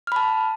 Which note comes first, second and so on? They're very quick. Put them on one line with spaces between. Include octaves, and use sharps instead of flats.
F6 B5 A5